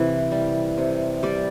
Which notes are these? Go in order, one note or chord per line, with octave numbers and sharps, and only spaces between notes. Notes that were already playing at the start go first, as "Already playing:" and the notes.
Already playing: C3 E3 B4
G3
C3
G3 D5